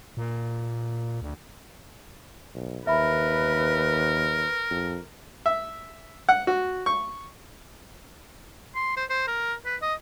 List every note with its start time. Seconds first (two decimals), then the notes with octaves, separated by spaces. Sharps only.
0.17 A#2
1.22 D2
2.55 B1
2.87 D#2 A#4 B4 E5 B5
4.70 F2
5.46 E5
6.29 F#5
6.47 F#4
6.86 C#6
8.75 C6
8.97 C5
9.10 C5
9.27 A#4
9.66 B4
9.82 D#5